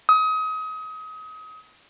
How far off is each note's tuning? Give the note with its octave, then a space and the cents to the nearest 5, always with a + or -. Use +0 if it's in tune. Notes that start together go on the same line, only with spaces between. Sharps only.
D#6 +30